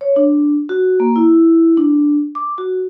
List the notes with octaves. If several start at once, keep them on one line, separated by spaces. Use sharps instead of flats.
C#5
D4
F#4
A#3
E4
D4
D6
F#4